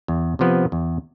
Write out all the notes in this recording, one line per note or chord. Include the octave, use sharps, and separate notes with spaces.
E2
C3 F3 B3
E2